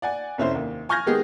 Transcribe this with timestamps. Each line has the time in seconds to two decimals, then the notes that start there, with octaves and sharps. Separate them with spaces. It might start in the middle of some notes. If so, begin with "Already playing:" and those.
0.02 D5 F#5 G#5
0.38 F1 C#4 E4 C5
0.55 D#2
0.89 G#5 C#6 F6 G6 G#6 A#6
1.06 D#3 G#3 B3 G4 G#4